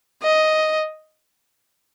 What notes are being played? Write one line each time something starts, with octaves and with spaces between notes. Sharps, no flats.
D#5